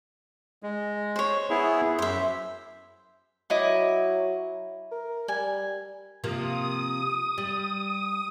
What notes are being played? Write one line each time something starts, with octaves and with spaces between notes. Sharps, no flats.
G#3
C5 C#5
B3 E4 G#4
F#2 C5 E5
F#3 E4 D#5 D6
A#4
G3 G#5
C3 F3 A#3 D#6
G3